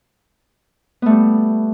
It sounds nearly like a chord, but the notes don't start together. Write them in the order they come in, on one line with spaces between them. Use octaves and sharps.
B3 A3 G3